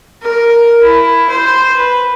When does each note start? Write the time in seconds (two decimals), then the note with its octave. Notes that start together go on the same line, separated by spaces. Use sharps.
0.23 A#4
0.83 E4
1.30 C5
1.76 B4